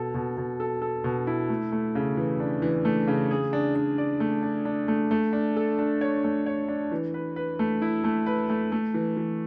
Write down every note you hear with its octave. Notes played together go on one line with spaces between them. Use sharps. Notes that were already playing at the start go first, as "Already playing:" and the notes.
Already playing: B2 A4
B2
B2
A4
A4
B2
E4
A3
A3
C#3
E3
D4
E3
A3
C#3
G#4
D4
D4
D5
A3
D4
D4
A3
A3
D4
A4
D4
C#5
A3
C#5
D4
E3
B4
B4
A3
E4
A3
B4
A3
A3
E3
E3